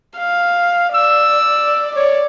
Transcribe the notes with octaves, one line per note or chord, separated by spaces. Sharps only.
F5
D5 E6
C#5 D5